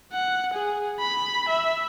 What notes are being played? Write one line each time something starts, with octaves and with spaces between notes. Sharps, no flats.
F#5
G#4
B5
E5